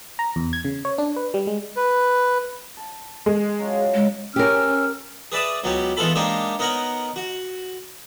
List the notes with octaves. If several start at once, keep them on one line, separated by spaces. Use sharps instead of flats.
A#5
E2
G#6
C#3
C#5
D4
B4
G3
G#3
B4
A5
G#3
F#3 C#4 F4
G#3
C#4 G4 A#4 E6 F6
G#4 B4 D5 E5 D#6
C#2 F#3 B3 C#4 G4
E3 G#3 B3 F4 A4 B5
G#3 A#3 D4 D#4 G4 C#5
B3 D#4 A#4 C#5 F#5
F#4